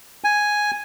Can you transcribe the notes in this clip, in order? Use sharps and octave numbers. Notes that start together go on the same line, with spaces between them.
G#5